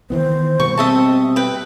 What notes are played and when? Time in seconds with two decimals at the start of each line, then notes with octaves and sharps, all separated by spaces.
0.10 D#3 E3 B3 C5
0.60 B2 G3 A#3 C#6
0.78 C4 D#5 E5 A5
1.36 B4 G5